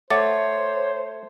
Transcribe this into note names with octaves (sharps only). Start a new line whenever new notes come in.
A3 C5 C#5 F#5 D6 A6